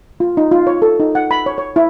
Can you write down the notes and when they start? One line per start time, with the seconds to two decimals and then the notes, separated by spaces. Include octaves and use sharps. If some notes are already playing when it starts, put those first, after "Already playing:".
0.20 F4
0.37 D#4
0.51 F4
0.67 C#5
0.82 A4
1.00 D#4
1.15 F#5
1.31 B5
1.46 C#5
1.58 C#5
1.76 E4